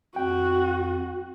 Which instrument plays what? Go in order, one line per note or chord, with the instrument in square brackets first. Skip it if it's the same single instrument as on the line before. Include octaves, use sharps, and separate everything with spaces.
[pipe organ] F2 [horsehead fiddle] F#4 [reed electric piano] G5